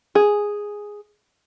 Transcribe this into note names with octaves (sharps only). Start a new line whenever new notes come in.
G#4